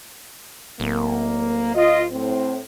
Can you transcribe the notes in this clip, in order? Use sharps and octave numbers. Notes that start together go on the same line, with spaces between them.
D1 A#3
F4 D#5
A2 C4